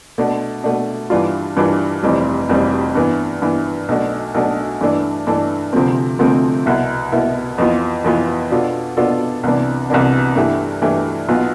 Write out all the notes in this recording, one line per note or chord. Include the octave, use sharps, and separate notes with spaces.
B2 A3 D4
B2 A3 D4
G2 E3 G3 D4 F4
G2 E3 G3 D4 F4
F1 F2 E3 G3 C4
F1 F2 E3 G3 C4
G2 E3 B3
G2 E3 B3
B1 B2 A3 D4
B1 B2 A3 D4
G2 E3 A3 D4 A4
G2 E3 A3 D4 A4
D2 C3 F3 A3 C4
D2 C3 F3 A3 C4
C2 B2 B3 E4
C2 B2 B3 E4
F2 E3 B3 F4
F2 E3 B3 F4
B2 B3 D4 F4 A4
B2 B3 D4 F4 A4
C2 C3 E3 B3 D4
C2 C3 E3 B3 D4
G2 E3 A3 E4 G4
G2 E3 A3 E4 G4
B1 B2 B3 F4